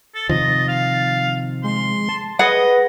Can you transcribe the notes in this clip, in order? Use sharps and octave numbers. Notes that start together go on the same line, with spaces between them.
A4 A6
C3 D#3 F3 D#5
F5
G#3 C6
A5
G#4 B4 D#5 F#5